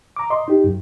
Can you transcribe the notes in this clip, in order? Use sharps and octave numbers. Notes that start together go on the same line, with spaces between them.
A#5 D6
D#5 C6
D#4 G4
F#2